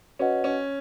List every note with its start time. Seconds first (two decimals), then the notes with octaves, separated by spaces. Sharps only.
0.19 C#4 F#4 B4 D#5 F#5
0.44 C#4